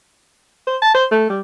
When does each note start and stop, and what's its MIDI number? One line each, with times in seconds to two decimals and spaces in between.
0.67 0.77 72
0.82 0.91 81
0.95 1.05 72
1.11 1.27 57
1.30 1.41 55